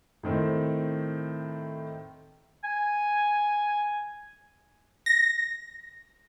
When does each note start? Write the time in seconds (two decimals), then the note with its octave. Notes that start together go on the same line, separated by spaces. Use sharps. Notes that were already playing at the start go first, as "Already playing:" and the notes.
0.23 A2 D#3 C4
2.64 G#5
5.06 A#6